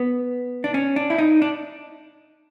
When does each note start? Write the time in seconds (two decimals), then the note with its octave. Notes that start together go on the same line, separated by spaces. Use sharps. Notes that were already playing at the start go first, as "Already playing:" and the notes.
Already playing: B3
0.64 D4
0.74 C#4
0.96 D4
1.10 E4
1.18 D#4
1.42 D4